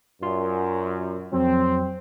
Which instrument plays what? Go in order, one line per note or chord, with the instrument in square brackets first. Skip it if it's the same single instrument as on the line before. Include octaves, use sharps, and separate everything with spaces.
[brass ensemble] F#2 [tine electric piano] F4 D5 C6
[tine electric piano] F2 F#3 [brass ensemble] C4